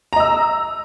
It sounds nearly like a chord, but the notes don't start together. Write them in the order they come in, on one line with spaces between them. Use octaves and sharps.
A#5 D#5 E6